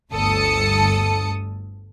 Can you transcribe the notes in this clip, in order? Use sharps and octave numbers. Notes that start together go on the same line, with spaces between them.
G1 D2 A4 A5 D#6 C#7